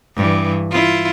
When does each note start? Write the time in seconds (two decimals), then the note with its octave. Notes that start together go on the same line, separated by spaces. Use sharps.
0.16 G2 E3
0.71 E4 F4